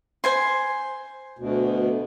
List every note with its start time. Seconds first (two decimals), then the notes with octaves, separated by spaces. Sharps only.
0.24 C5 G#5 C6
1.39 D2 B2